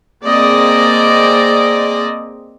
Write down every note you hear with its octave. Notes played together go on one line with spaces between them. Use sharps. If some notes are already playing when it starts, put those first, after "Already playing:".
A#3 C4 G#4 D5 D#5